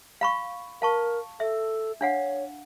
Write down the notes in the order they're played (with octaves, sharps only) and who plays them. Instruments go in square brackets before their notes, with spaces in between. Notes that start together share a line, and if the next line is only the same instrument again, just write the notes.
[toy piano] F5 B5 C#6
[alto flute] A#4 [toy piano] F5 A5 C#6
[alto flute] A4 [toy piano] E5
[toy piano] D4 F5 F#5 [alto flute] C#5